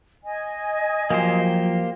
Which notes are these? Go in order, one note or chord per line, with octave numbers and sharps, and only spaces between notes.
D#5 G#5
F3 F#3 A#3 G4 C5